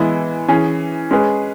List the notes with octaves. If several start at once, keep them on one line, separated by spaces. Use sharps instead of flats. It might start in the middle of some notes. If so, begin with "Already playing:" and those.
Already playing: E3 G#3 B3 E4
E3 C#4 G#4
G#3 C#4 G#4 B4